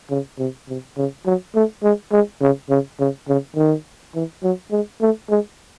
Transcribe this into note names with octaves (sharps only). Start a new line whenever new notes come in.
C#3
C3
C3
C#3
F#3
A3
G#3
G#3
C#3
C#3
C#3
C#3
D#3
E3
F#3
G#3
A3
G#3